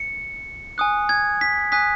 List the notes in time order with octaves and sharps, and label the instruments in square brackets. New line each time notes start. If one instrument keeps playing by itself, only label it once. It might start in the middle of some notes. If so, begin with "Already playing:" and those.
Already playing: [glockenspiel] C#7
G#5 D#6 F#6
G#6
B6
G#5 D#6 F#6 B6